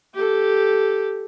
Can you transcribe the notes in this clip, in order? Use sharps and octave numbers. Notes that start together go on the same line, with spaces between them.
G4 A4